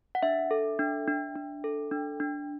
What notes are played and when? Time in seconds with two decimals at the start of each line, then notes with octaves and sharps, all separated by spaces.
0.15 F#5
0.23 D4 E5
0.51 A4
0.79 D4
1.08 D4
1.35 D4
1.64 A4
1.91 D4
2.20 D4